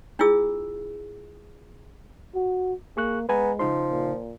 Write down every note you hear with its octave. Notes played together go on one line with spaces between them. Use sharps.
D4 E4 F4 G#4 E6
F#4
A#3 G#4 C#6 F#6
G#3 B3 B4 G#5 A#5
C#3 F3 D#4 C6
A#2